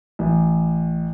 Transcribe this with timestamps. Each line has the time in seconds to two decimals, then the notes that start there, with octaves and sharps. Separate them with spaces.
0.19 A1